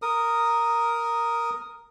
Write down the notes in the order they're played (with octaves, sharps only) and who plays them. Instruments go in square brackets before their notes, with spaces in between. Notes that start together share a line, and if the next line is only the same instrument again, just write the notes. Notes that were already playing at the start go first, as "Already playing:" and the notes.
[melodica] A#4 D#6